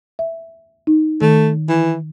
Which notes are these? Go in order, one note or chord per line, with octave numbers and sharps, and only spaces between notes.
E5
D#4
D#3 A3
E3